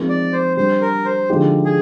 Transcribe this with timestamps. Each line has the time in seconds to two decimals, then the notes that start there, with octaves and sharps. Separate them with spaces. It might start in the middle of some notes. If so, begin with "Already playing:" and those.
Already playing: F3 G#3 C4 D#4 A#4
0.09 D5
0.33 C5
0.57 G3 D4 G4 C5
0.81 A#4
1.05 C5
1.30 D3 F3 G#3 D#4 G4
1.65 G#4